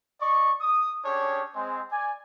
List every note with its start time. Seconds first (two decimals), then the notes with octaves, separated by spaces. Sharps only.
0.20 D5 D#5 C#6
0.60 D#6
1.05 C#4 D4 G4 G#4 C#5
1.54 G#3 C4
1.90 D5 G#5